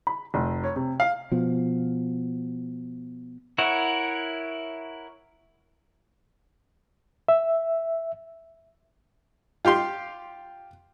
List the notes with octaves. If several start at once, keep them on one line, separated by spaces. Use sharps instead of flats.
B5
F1
C#5
C3
F5
B2 F3
E4 A#4 C#5 F#5
E5
F4 G4 F5 C6